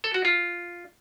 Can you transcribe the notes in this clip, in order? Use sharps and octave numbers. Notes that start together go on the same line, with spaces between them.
A4
F#4
F4